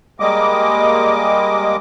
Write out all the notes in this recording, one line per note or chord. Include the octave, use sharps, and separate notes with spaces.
G3 G#3 A#3 D#5 D6